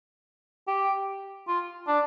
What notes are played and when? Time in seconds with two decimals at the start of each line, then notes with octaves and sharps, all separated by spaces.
0.67 G4
1.48 F4
1.87 D4